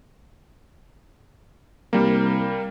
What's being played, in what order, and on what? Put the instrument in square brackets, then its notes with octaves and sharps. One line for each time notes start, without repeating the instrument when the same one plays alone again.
[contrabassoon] C2 [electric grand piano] G3 A#3